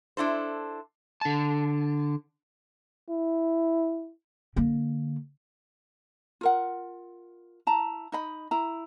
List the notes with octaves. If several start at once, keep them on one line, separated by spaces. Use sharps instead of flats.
D4 E4 A4 C5
D3 A5
E4
D3 A#3
F4 A#4 F#5
E4 A5 A#5
D#4 D#5 B5
E4 A#5